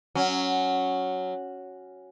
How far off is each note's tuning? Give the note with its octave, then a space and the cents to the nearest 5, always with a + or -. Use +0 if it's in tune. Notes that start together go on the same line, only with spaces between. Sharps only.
F#3 +0 C#4 +0